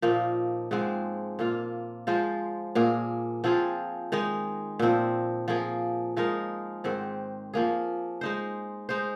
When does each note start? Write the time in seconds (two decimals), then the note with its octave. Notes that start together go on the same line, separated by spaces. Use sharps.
0.02 A#2 F3 A#3 D#4
0.71 G#2 F3 G#3 C4
1.39 A#2 A#3 F4
2.07 F3 G#3 F4 C5
2.75 A#2 A#3 G#4
3.44 F3 C4 F4 G#4
4.12 D#3 G#3 D#4
4.79 A#2 F3 C4
5.48 F3 A#3 G#4
6.17 F3 G#3 D#4 A#4
6.84 G#2 D#3 C4
7.54 F3 A#3 G#4
8.21 G#3 D#4 C5
8.89 G#3 D#4 C5